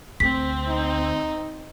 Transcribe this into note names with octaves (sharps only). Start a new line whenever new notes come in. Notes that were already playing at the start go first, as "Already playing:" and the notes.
D2 C4 B6
D#4